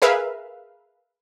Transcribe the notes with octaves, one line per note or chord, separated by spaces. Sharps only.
G#4 A#4 B4 E5 F5